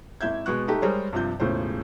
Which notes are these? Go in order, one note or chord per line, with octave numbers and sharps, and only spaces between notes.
G#1 E4 E5 G6 G#6
B2 G#3 B3 C#6 F#6
A3 D#4 G4
G3 G#3 G#4 A#4 C5 C#5
G2 C3 F3 G6
E1 A2 C#3 F3 C5